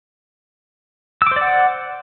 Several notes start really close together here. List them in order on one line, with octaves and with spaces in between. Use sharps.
E6 D6 C5 D5 F#5